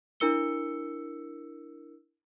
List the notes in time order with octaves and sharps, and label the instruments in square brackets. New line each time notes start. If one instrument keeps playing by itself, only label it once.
[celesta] D4 E4 A#4 E6 C#7 G7